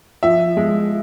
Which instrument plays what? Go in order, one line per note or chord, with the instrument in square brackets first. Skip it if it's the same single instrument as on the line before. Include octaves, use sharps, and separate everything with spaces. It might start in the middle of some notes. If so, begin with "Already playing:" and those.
[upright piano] F3 E5
G#3